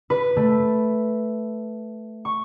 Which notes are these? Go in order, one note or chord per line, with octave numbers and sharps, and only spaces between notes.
B4
A3
C#6